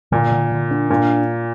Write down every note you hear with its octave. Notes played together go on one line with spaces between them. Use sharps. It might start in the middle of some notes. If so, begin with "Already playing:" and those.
A#2 D3
D3
D3
D4
A#2 D4